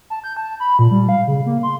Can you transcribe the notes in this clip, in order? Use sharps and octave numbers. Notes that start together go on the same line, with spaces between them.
A5
G6
A5
B5
A#2
G3
F5
C#3
A#3
C6